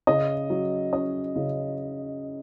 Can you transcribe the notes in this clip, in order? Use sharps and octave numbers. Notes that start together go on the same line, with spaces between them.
C#3 D#5
F#3
C#4 D#5
C#3